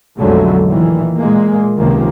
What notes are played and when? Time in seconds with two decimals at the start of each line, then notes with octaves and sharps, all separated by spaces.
0.18 B1 F2 D3 F#3 G#3 A3
0.68 A#2 D#3 E3
1.18 A#2 G#3 A#3
1.76 C#2 C3 D#3 F3 A#3